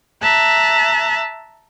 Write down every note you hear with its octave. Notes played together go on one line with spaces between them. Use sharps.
E5 A5 A#5 F#6